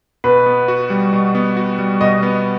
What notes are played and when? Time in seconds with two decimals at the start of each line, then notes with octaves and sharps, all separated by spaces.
0.24 B2 B4
0.46 B3
0.68 F#4
0.90 G3
1.13 B2
1.35 B3
1.57 F#4
1.79 G3
2.01 B2 D#5
2.23 B3